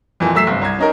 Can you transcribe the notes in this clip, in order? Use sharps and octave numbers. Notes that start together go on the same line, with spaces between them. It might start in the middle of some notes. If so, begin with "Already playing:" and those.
F2 A#2 E3
F#3 A3 E6 B6 C7 E7
G1 C3
C2 A#5 G#6
C#4 D#4 A#4